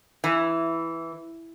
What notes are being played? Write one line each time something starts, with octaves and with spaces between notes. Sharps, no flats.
E3